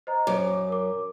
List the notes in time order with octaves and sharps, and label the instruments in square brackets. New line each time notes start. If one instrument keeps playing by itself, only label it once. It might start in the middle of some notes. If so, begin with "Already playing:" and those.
[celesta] C5 D#5 A#5
[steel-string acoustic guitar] F#2 [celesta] D6
[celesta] A#4 D6